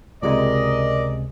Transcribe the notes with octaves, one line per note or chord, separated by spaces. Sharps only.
C#2 C3 G#3 A#4 D5 D#5